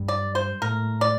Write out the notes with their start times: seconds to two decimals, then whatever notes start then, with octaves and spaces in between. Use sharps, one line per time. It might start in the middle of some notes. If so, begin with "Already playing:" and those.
Already playing: G2
0.08 D5
0.35 C5
0.62 A2 A#4
1.01 D5